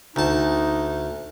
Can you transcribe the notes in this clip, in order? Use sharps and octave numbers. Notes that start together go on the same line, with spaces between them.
D2 D#4 A5